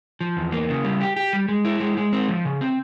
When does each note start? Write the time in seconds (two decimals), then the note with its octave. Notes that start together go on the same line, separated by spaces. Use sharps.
0.21 F3
0.37 E2
0.52 A#3
0.69 C#3
0.84 G3
1.01 G4
1.16 G4
1.33 G3
1.48 G#3
1.65 E4
1.80 G#3
1.97 G#3
2.13 C4
2.28 F3
2.45 C#3
2.61 C4